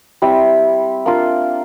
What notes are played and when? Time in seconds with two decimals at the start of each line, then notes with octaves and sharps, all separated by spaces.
0.22 G3 C4 E4 E5
1.06 A#3 D4 F4